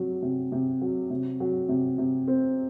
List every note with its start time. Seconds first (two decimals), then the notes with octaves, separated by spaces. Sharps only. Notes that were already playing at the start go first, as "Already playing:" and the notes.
Already playing: C3 F#3
0.22 C3
0.52 C3
0.81 F#3
1.10 C3
1.40 F#3
1.69 C3
1.98 C3
2.28 C4